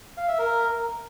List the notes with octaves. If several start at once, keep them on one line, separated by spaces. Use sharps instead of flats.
F5
E5
A#4